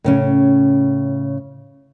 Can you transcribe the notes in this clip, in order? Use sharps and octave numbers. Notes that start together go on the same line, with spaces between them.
A2 C#3 C#4